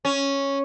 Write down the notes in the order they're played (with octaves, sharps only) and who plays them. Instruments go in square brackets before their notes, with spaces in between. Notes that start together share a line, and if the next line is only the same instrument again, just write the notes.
[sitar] C#4